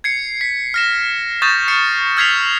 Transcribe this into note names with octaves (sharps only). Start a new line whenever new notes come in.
G#6 C7 C#7
B6
F6 A#6 E7
C#6 D#6 G6 A6 A#6 E7
F6 C7 C#7
E6 F6 G#6 B6 C7 F7